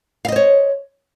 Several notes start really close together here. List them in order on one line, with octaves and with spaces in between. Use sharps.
F5 D#5 C5 C#5